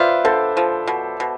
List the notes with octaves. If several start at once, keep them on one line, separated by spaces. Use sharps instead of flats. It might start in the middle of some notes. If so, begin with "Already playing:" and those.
Already playing: F4 B4 C5 D5 E5
D3 A4 C5
F3
B2
B2